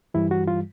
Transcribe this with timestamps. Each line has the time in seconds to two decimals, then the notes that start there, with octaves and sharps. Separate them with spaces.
0.14 G2 E3 G3 E4
0.31 F#4
0.48 F4